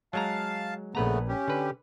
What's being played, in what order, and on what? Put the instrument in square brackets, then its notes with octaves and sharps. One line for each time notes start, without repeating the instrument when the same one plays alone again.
[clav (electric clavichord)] F#3 G#3 A#5 [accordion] F5 A5
[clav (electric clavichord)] A#1 B4 A#5 [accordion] C#3 A3 B3
[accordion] C#4 G4
[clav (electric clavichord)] D3 B4